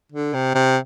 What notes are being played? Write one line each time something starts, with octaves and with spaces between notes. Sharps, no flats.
D3
C3
C3